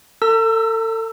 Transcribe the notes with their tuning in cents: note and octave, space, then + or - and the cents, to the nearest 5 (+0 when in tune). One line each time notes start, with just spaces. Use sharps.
A4 +35 A#5 -40 E6 +0